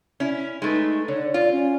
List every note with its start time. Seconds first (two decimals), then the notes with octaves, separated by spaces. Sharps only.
0.20 C#4 E4
0.62 G#3 A3 D#4 B4
1.08 D3 C#5
1.34 F4 D5
1.52 C#4